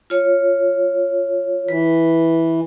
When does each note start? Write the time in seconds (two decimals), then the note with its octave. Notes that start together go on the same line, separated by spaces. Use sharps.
0.10 F4 C#5
1.68 E3 B4